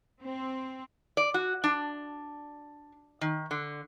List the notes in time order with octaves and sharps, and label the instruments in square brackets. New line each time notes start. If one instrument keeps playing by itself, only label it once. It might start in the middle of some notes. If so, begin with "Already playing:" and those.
[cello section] C4
[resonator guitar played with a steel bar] D5
F#4
D4
D#3
D3